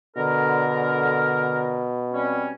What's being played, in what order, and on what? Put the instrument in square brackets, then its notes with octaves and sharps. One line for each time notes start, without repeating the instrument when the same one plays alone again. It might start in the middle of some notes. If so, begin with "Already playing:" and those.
[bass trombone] B2 [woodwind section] D3 A#4
[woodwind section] G3 C4 C#4